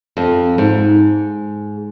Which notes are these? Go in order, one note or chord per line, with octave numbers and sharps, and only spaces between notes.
F2
G#2